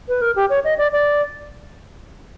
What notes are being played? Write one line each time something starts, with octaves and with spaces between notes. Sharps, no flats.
B4
A#4
G4
C#5
D#5
D5
D5